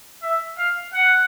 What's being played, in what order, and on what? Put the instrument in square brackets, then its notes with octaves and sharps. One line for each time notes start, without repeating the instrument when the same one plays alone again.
[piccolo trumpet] E5
F5
F#5